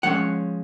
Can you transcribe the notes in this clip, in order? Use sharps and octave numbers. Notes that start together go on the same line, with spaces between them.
F3 G#3 C#4 F#5